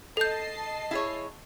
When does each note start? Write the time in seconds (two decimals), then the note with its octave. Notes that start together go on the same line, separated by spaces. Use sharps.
0.17 A4 D#5 A5 G6 C7
0.91 E4 G#4 C#5